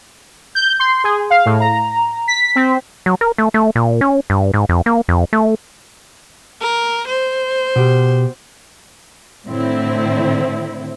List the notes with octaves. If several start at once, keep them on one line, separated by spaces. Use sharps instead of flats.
G6
C6
G#4
F5
A2
A#5
B6
C4
F#3
A#4
A3
A3
A#2
C#4
G2
G#2
F2
A#3
F2
A3
A#4
C5
B2 G4
A2 D3 D#3 C4 E4